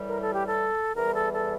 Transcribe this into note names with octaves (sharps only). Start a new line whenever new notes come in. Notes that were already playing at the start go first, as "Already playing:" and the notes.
Already playing: A2 E3 G3
A#4
A4
G4
A4
E2 E3 G3 A#4
A4
A4